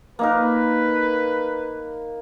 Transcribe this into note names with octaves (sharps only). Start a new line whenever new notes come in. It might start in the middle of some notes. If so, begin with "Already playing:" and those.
A#3 D#4 A#4 B4